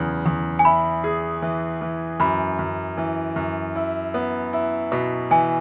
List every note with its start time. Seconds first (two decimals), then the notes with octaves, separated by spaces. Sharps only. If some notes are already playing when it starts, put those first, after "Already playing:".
Already playing: E2 C#3 F#3
0.26 E2
0.59 G#5
0.65 E4 B5
1.04 G#4
1.42 E3
1.81 E3
2.20 F#2 B5
2.59 F#2
2.97 E3
3.36 F#2
3.76 E4
4.14 B3
4.53 E4
4.92 B2
5.31 E3 G#5